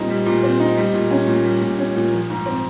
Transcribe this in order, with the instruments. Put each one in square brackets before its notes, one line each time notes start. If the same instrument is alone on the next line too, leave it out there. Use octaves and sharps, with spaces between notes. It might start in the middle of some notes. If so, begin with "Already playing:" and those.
Already playing: [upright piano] A#2 G3 C4 D#4
G3
A#2
C4
D#4
G3
A#2
C#4
A#2
G3
A#2
C#4
A#2
F3
G#2
C4